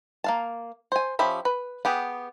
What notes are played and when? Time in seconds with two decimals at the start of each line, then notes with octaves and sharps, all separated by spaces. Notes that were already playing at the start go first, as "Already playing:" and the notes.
0.24 A#3 F5 A5
0.92 C5 G#5
1.19 F3 C#4 G4 E5 B5
1.45 B4
1.85 B3 G4 G#4